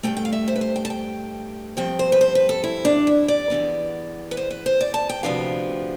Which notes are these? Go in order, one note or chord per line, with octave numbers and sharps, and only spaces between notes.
G2 E3 A3 G5
G5
F5
E5
C5
B4
C5
G5
A5
G5
G2 F3 C4 G5
C5
B4
C5
B4
A4
E4
D4
E4
D5
E2 C3 E3 B3
B4
C5
B4
C5
D5
A5
G5
D2 C3 F3 B3 D4 F5